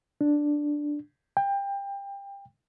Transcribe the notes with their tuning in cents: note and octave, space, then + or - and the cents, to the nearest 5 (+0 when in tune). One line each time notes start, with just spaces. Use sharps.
D4 +0
G5 +25